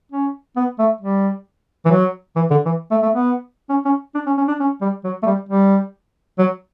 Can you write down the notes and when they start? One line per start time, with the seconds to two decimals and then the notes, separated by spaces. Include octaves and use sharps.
0.12 C#4
0.56 B3
0.79 A3
1.01 G3
1.85 E3
1.91 F#3
2.36 E3
2.50 D3
2.65 E3
2.91 A3
3.02 A3
3.14 B3
3.69 C#4
3.85 C#4
4.15 D4
4.26 C#4
4.37 C#4
4.48 D4
4.60 C#4
4.81 G3
5.04 F#3
5.23 A3
5.26 G3
5.49 G3
6.38 F#3